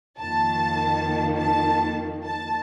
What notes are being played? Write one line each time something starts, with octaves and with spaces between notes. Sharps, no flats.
F2 D#3 A#3 A5
A5
A5